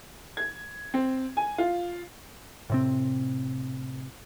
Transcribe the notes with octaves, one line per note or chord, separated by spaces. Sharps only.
G#6
C4
G#5
F4
A2 C3 C4